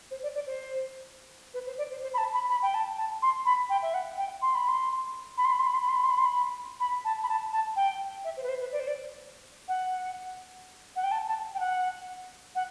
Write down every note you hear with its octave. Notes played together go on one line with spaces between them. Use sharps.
C5
D5
D5
C5
B4
C5
D5
C5
C5
B5
A5
B5
B5
G5
A5
A5
C6
B5
G5
E5
F#5
G5
C6
B5
C6
B5
C6
B5
C6
B5
C6
B5
C6
B5
C6
B5
C6
B5
B5
A5
B5
A5
A5
G5
E5
C5
B4
C5
B4
D5
C5
D5
F#5
F#5
G5
A5
A5
G5
F#5
F#5